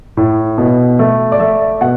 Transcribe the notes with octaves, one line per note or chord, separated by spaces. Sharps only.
A2
B2
A3
D5
A3 E5
B2 F#5